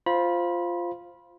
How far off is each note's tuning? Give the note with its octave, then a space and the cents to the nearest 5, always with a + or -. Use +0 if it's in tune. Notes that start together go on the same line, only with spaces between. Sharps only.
F4 +0 C5 +0 B5 -25